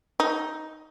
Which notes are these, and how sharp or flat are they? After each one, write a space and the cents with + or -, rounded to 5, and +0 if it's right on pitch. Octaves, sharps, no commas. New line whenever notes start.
D#4 +5